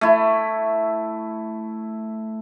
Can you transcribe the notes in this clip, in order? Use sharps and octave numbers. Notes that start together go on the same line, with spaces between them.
A3 E4